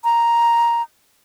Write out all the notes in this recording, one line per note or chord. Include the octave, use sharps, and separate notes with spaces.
A#5